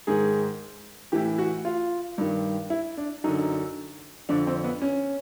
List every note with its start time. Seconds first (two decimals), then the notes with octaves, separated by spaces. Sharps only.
0.07 G#2 D#3 G#4
1.12 A2 E3 G4
1.38 F#4
1.65 F4
2.18 G2 D#3
2.70 E4
2.97 D4
3.24 F#2 D3 D#4
4.29 F2 D3 D4
4.47 C4
4.64 B3
4.82 C#4